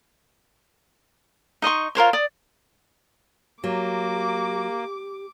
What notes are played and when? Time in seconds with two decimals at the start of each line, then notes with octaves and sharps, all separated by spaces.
1.62 D#4 D#5 C6 C#6
1.95 F4 A#4 C5 C#5
2.13 D5 D#6
3.64 F#3 A#3 G4 D6